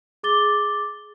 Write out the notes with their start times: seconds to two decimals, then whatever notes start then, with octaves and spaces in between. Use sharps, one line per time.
0.23 G#4 D6 A6 G7